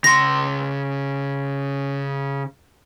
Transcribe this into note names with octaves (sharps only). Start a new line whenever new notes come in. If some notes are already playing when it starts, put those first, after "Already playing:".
C#3 C6 A#6